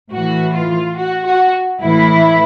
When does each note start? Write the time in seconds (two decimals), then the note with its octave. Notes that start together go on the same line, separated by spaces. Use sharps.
0.12 A2 E3 F#4
0.54 F4
0.97 F#4
1.25 F#4
1.81 A2 E3 E4